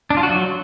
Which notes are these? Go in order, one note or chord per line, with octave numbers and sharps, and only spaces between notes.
D4
F4
F#4
F#3